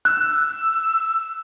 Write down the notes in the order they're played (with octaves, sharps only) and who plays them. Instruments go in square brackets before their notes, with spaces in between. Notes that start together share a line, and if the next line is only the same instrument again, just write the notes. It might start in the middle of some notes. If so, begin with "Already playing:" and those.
[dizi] E6 [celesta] F#6